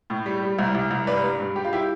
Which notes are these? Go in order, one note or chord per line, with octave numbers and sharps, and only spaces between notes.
A2
G3
G3
C2
C2
C2
G2 B4 D5
G2
G2
G3 G4
F4
E4 G4